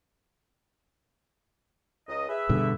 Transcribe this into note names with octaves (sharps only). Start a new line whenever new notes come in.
C#2 D#5
G#4 B4 E5
G2 B2 D3